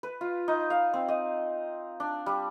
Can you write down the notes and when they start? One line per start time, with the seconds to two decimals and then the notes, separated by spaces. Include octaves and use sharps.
0.03 B4
0.21 F4
0.48 D#4
0.70 F5
0.94 C4
1.09 D#5
2.00 D4
2.26 G3